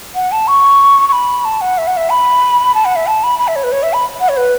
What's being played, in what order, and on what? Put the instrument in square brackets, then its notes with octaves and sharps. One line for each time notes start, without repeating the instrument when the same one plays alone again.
[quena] F#5
A5
C#6
C#6
B5
A5
F#5
E5
F#5
E5
B5
A5
F#5
E5
A5
B5
B5
E5
C#5
B4
C#5
E5
B5
F#5
C#5
B4